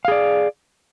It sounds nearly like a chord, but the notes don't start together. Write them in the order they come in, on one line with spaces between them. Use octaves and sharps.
F5 G#4 D5